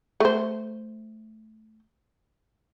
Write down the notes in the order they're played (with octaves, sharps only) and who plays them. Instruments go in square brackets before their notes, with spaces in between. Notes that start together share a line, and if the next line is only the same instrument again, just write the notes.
[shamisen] A3 C5